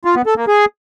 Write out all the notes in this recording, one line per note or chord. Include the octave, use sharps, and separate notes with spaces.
F4
B3
A4
A#3
G#4